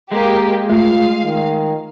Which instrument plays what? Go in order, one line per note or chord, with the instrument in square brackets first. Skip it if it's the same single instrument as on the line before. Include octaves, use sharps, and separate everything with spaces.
[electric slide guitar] G#3 [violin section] A#3 G4
[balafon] A3 [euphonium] F4 [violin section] F5
[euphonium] D#3